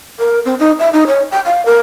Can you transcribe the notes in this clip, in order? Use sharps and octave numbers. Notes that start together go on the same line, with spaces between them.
A#4
C4
D#4
E5
D#4
C#5
G5
F5
A#4